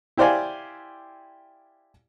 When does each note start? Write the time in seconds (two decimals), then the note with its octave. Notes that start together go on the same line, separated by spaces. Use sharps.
0.17 E4 G4 C5 D5 F5 G#5